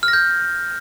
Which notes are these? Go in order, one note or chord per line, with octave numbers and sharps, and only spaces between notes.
F6
A#6
G6